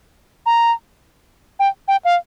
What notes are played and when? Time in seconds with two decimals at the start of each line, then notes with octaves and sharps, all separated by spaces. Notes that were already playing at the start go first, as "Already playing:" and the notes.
0.46 A#5
1.59 G5
1.88 G5
2.05 F5